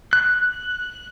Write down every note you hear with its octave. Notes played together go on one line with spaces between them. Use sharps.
F#6